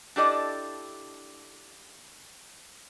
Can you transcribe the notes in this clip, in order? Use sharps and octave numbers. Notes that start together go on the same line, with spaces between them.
D4 E4 G4 A4 D5 D#5